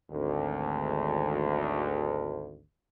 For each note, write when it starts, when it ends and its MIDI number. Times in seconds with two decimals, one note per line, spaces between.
0.11 2.60 32
0.11 2.60 38